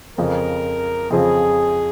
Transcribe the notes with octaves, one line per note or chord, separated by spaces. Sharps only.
F2 C#3 F3 C4 A#4
F2 C#3 F3 C4 G#4